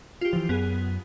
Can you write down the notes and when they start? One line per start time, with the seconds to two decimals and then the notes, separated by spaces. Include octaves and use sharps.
0.21 F4 G4
0.33 E3 F3
0.49 F#2 B3 G#4